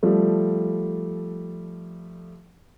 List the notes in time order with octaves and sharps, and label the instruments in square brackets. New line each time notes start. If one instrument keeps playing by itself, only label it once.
[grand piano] F3 G3 A3